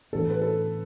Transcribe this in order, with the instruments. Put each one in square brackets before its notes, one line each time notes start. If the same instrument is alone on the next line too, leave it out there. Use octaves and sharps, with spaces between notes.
[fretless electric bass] A2 E3 B3 D4 [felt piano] A4
[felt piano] B4
A4